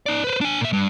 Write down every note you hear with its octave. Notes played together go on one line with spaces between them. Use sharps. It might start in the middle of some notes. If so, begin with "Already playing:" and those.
D#4 D5
B4 C5
D4 G#5
A#2 E5
G2